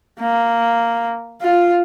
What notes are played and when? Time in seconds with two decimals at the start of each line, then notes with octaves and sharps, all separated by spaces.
0.19 A#3
1.41 F4